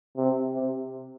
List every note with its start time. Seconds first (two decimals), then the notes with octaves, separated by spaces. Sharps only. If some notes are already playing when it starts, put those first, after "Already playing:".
0.17 C3
0.55 C3